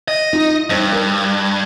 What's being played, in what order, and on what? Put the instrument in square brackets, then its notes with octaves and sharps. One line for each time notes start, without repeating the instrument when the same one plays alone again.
[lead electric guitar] D#5
[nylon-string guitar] D#4 F4
[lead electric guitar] G2 [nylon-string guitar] D#4 C5 C#5
[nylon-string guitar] A#4